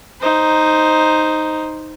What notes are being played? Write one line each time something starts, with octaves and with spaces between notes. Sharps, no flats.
D#4 C5